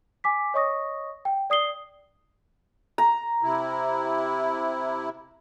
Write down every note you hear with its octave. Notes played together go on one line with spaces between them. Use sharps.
G#5 D6 B6
C#5 D#5 C#6 D#6 A#6
G5
D5 D#6 C7 G7
A#5
C3 E4